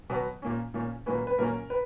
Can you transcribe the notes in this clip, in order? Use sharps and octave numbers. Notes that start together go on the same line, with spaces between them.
B2 F#3 B3
A#2 A#3 C#4
A#2 A#3 C#4
A#2 F#3 A#3 C#4 B4
B4
A#2 F#3 A#3 C#4 A#4
B4